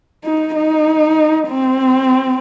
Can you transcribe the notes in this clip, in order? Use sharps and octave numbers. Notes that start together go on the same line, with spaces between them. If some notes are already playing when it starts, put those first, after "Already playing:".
D#4
D#4
C4